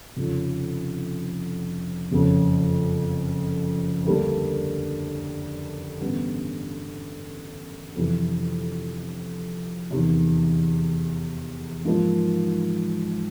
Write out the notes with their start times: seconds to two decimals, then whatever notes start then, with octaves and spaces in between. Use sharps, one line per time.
0.17 F1 F2 C#3 F3
2.11 F#1 F2 C#3
4.06 D2 D3 G3 A#3 D4
6.00 A1 G2 D3 G3 B3
7.96 F2 C3 E3
9.91 E2 C3 D#3
11.85 G#2 F3 A#3 D#4